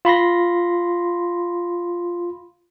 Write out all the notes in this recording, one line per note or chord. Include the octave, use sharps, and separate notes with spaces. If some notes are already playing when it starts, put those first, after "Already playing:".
F4 B5 C6 A#6